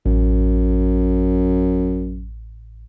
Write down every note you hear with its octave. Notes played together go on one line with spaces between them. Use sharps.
A1 F#2